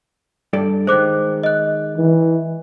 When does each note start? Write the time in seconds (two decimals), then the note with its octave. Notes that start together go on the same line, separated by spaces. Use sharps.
0.53 G2 A4 D5
0.87 D#3 G#3 C5 D6 F#6
1.43 D#5 F#6
1.97 E3